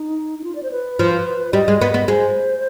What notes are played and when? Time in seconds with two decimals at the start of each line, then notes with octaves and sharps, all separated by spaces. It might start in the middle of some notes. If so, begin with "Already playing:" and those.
Already playing: D#4
0.39 D#4
0.44 F4
0.55 D5
0.63 C5
0.71 B4
0.99 F3
1.53 G3 D#5
1.68 G#3
1.81 B3
1.94 B3
2.08 G#3 C5